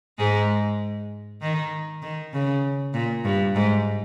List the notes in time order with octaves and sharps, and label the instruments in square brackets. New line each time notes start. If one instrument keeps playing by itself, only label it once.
[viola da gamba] G#2 G#3
D#3
D#3
C#3
A#2
G2
G#2